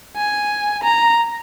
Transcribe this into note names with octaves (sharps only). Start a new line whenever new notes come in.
G#5
A#5